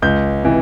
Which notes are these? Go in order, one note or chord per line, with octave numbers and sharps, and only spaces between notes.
C#2 G6
C3 E3